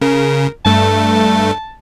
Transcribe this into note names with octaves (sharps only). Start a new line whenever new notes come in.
C#3 A#4
G2 A3 A5